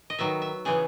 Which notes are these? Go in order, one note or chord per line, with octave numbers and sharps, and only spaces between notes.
D#5
D#3 F#3 B3 E5
E5
C#3 E3 B3 G#4